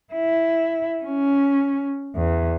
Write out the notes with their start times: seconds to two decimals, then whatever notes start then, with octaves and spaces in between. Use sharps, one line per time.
0.13 E4
1.04 C#4
2.16 E2